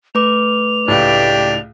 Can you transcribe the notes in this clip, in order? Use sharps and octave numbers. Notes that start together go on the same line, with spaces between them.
A3 B4 D6 F7
C#2 A2 D4 G4